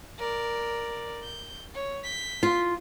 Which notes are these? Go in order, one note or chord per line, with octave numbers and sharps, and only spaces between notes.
A#4 D5
G6
C#5
G6 B6
F4